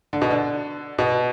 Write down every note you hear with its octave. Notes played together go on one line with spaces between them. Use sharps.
D3
B2
D3
B2